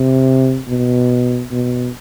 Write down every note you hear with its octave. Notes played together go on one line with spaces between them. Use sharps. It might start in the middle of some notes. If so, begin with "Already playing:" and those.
Already playing: C3
B2
B2